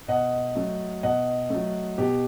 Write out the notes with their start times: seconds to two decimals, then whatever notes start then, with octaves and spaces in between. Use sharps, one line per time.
0.08 B2 D#5 F#5
0.55 F#3 A3
1.03 B2 D#5 F#5
1.50 F#3 A3
1.98 B2 G4